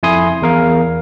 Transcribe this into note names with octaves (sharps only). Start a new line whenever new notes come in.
F2 E4 G#5 C6 D#6
E2 A#4 F5